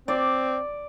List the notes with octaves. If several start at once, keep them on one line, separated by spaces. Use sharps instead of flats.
C4 D5